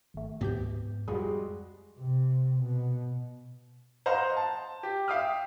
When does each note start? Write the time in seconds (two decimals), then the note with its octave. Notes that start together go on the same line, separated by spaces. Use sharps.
0.14 G#1 A3
0.41 D2 G#2 B3 G4 G6
1.08 F2 G3 G#3 F4 F#4 G#4
1.98 C3
2.62 B2
4.06 C5 D#5 F5 F#5 A#5 C6
4.37 A5
4.83 G4
5.08 E5 F5 G5 D#6 F6